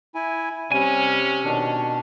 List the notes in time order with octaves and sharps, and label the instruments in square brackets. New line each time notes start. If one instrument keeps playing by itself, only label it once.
[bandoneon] E4 G#5
[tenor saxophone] C3 [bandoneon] G3 [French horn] C#4 [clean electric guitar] G#5
[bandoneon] B2 D#3 D4